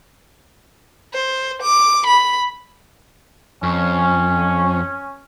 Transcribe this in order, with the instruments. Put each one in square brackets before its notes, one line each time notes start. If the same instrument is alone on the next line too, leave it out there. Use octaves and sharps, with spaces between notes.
[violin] C5
D6
B5
[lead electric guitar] F2 [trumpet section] C#4